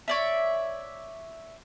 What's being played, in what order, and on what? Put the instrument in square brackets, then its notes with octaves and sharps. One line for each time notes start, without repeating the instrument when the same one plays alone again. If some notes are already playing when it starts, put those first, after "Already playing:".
[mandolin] C#5 D5 E5